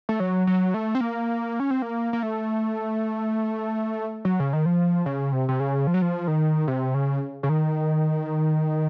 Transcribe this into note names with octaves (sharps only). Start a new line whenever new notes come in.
A3
F#3
F#3
A3
C4
A#3
C#4
C4
A#3
A#3
A3
F#3
C#3
D#3
F3
C#3
C3
C3
C#3
F3
F#3
F3
D#3
C3
C#3
C#3
D#3